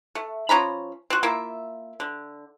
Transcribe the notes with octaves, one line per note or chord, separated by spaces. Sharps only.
A3
F3 C#4 A#5 B5
C4 F#4
A#3 E4 F4 E5
D3